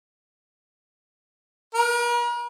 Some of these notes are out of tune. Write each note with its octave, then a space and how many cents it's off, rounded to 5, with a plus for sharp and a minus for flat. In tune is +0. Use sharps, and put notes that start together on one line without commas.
A#4 +45